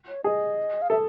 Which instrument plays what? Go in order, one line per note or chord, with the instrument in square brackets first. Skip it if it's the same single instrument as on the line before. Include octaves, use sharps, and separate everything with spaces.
[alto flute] C#5
[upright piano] G#4 [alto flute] D#5
[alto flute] F5
[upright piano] A4 [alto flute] E5